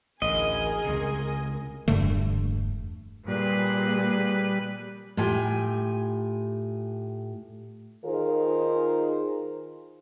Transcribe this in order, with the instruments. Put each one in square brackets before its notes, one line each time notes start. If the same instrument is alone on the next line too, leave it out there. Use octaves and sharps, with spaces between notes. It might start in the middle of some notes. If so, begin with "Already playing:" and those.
[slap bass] A1 D2 [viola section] G#4 A#4 G#5 [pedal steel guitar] D#5
[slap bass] C#2 C3
[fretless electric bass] E1 G2 D3 A3
[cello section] A#2 G#4 [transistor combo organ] G3 [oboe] B4
[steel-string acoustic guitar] A2 F4 G4 G#5
[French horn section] D#3 D#4 F4 G#4 A#4 C5